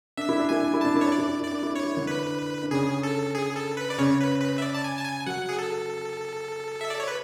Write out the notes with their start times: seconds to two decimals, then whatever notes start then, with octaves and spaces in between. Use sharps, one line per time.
0.17 D4 E5
0.29 E4
0.39 D4
0.49 E4 G#5
0.62 D4
0.74 E4
0.81 D4 A5
0.95 E4
1.01 C#5
1.07 D4 D5
1.18 E4
1.29 D4
1.40 E4 D5
1.52 D4
1.63 E4
1.74 D4 C#5
1.86 E4
1.97 D3 D4
2.07 B4
2.63 D4
2.71 C#3 C#4 G#4
3.03 A4
3.35 G#4
3.56 A4
3.77 B4
3.90 D5
3.98 C#3 C#4 C#5
4.20 B4
4.41 B4
4.58 E5
4.62 D5
4.74 A5
4.84 G#5
4.97 A5
5.05 G#5
5.26 F#3 F#5
5.49 G#4
5.59 A4
6.81 E5
6.90 D5
7.00 C#5
7.08 B4